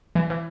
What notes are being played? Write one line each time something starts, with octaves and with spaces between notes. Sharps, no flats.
E3
E3